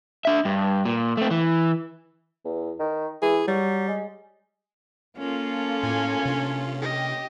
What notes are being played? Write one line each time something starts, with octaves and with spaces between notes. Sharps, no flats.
D4 E5
G2
A#2
A3 C4
E3
E2
D#3
E3 G#4
F#3 G3
G#3
A#3 C#4 F4 A4
A2 G#5
C3 D4
G4 D#5